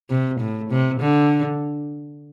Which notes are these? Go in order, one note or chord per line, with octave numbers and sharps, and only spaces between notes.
C3
A2
C3
D3